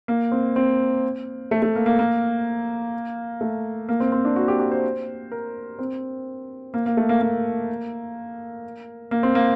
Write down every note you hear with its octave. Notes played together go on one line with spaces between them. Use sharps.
A#3
C4
C4
A3
A3
A#3
A#3
A#3
A3
A#3
C4
C4
D4
F#4
G4
G4
C5
A#4
C4
A#3
A#3
A3
A#3
A#3
A#3
C4
A#3